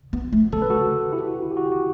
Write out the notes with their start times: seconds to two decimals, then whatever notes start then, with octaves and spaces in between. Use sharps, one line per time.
0.13 B3
0.33 A3
0.52 C#3 A4
0.62 B4
0.70 F#4 A4
1.12 E4 G4
1.28 F#4
1.42 E4
1.51 G4
1.57 F#4
1.66 G4
1.72 F#4